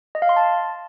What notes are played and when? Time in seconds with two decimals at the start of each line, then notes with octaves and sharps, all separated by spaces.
0.15 D#5
0.22 F5
0.29 C6
0.36 A5